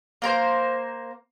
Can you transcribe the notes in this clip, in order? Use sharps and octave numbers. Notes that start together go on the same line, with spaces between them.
A#3 A#4 C5